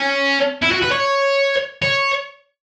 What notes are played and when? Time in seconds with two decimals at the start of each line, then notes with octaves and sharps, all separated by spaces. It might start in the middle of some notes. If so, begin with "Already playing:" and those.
Already playing: C#4
0.62 E4
0.71 F#4
0.82 B4
0.92 C#5
1.82 C#5